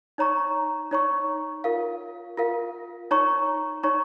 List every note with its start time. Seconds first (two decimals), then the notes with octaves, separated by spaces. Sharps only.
0.18 D#4 C#5 A#5 C#6
0.91 D#4 C#5 A#5 C#6
1.64 F4 A#4 F5
2.37 F4 A#4 F5
3.11 D#4 C#5 A#5 C#6
3.83 D#4 C#5 A#5 C#6